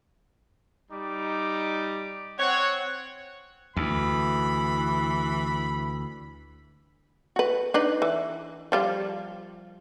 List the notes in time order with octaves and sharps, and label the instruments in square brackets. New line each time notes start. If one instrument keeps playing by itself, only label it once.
[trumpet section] G3 D#4 D6
[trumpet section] C4 F#5 [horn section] C#5
[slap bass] D2 [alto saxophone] E3 [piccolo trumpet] B5
[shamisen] F#4 B4
D4 D#4 B4
E3
F3 G3 F4